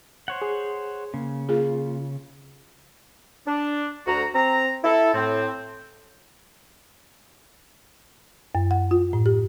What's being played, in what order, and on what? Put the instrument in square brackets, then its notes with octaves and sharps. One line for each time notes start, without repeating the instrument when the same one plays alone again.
[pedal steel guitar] C5 C#5 F#5
[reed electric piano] G#4
[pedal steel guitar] C#3 [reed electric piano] A#3
[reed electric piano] A#3 F4 [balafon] G#4
[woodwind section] D4
D2 F#4 A#5
C4 A#5
E4 A4
A2 C4
[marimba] F#2
F#5
F4
A2
G4